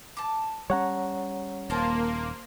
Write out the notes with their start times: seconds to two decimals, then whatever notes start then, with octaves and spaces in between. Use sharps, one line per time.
0.17 A5 D6
0.70 G3 C#4 C#5 F#5 A#5
1.70 D#1 A#3 A#4 C5 A5